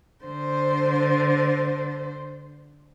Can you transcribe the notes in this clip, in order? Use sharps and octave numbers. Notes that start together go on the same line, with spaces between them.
D3 C5